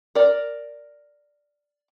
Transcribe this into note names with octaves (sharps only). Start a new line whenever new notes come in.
A#4 D5